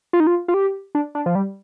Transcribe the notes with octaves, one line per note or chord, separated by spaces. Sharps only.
F4
D#4
F4
F4
G4
D4
D4
F3
G3